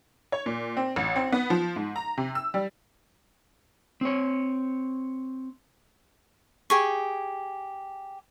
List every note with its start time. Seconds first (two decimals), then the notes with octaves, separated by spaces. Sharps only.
0.32 C#5
0.46 A#2
0.77 C4
0.96 A1
1.16 C4
1.32 B3
1.50 F3
1.76 G#2
1.96 A#5
2.17 C3
2.35 E6
2.54 G3
4.01 C4 C#5
6.70 G4 G#4 C#6